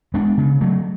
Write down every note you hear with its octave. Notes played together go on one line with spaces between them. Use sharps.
G#3 B3 D4
C#3
F#3 A3